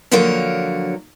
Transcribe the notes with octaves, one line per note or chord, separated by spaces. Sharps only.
D3 F3 F#3 A#3 A#4 C#5